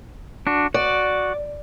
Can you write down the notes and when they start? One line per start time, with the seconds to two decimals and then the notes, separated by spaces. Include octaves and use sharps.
0.47 D4 F#4
0.74 F#4 D5